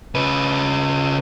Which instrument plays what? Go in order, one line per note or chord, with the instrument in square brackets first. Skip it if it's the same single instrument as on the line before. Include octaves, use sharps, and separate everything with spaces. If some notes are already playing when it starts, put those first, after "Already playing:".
[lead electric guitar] C#3 B4